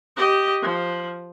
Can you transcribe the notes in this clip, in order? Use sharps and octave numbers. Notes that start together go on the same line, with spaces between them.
G4 D#5
F3